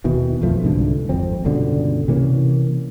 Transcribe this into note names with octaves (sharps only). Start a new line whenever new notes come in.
D#2 B2 D#3 E3
B1 F2 F3 A3
C2 G#2 D3
G#1 F2 C4
G1 C#2 B2 D3
C3 E3 A#3 C#4